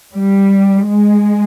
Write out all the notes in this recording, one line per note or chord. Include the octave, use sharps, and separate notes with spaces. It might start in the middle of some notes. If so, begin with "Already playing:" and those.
G3
G#3